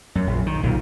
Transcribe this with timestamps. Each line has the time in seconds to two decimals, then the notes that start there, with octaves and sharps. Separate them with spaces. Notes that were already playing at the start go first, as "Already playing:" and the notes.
0.15 F#2
0.27 A#1
0.46 D#3
0.63 B1 A#2